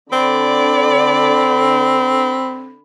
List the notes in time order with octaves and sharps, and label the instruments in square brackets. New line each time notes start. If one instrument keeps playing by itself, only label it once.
[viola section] D3 [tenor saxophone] C4 [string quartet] D5 [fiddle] B5